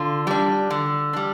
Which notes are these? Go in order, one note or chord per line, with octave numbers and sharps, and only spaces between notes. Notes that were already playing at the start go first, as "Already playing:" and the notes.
Already playing: D3 F4
G3 D4
D3
G3 D4